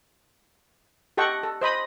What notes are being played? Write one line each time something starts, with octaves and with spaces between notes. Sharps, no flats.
G4 A4 D#5 F#5 G5 C#6
A4
C5 D#5 B5 D#6